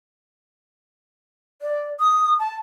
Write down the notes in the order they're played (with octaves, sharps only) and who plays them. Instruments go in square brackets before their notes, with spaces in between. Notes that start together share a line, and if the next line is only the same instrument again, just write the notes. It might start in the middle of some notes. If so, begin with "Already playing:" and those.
[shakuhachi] D5
D#6
A5